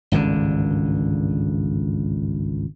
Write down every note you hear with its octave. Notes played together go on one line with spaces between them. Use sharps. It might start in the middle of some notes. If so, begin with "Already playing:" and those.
G#1 C#2 G2 D3